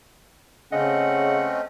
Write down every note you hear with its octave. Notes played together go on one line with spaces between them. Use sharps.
C#3 A3 C4 C#4 D#5 F#5